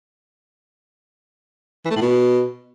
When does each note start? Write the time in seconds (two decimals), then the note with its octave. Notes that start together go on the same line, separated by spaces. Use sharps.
1.85 E3
1.91 A3
1.96 A2
2.02 B2